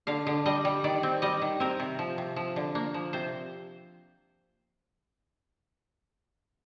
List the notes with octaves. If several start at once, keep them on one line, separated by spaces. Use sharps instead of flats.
D3 F5
D3
G3 D#5
G3
D#3 D5
C4
G3 D#5
D#3
C4 A#4
C3
F3
C3
F3
D3
A#3
F3
C3 C5